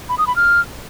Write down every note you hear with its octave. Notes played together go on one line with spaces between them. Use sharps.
B5
D#6
B5
F6